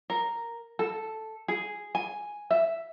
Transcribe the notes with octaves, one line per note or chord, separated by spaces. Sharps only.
A#4
A4
G#4
G#5
E5